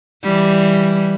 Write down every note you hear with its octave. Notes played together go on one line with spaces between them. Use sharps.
E3 G3